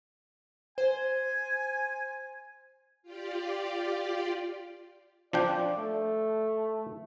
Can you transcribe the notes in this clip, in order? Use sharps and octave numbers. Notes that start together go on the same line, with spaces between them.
C5 G#5
F4 G4 D5
F3 D4 D5 G5
A3